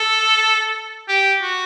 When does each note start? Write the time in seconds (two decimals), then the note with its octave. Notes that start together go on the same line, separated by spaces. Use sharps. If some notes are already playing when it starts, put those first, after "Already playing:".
Already playing: A4
1.09 G4
1.42 F#4